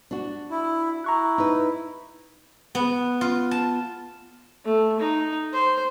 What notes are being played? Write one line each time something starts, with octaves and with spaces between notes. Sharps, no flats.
D4 F#4
E4
E4 A#5 C#6 F#6
D#4 B4
B3
F4
A5
A3
D#4
C5